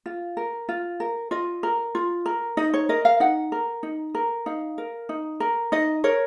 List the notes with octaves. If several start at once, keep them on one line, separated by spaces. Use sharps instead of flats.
F4
A#4
F4
A#4
F4 D#5
A#4
F4
A#4
D#4 D#5
C#5
A#4 D#5
F5
D#4 F#5
A#4
D#4
A#4
D#4 F5
A#4
D#4
A#4
D#4 D#5
A#4 C#5